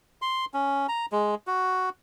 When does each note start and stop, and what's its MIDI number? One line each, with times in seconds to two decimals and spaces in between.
0.22 0.45 84
0.54 0.87 61
0.88 1.06 82
1.12 1.35 56
1.47 1.89 66